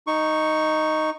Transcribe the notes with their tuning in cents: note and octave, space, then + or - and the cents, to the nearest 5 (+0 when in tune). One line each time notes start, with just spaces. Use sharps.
D#4 +0 C#6 +0